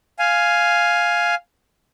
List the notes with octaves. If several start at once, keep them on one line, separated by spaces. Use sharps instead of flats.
F5 G#5